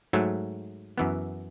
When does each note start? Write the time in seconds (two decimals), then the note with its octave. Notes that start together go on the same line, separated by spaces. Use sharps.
0.13 G#2 F#3 A3
0.98 F#2 E3 B3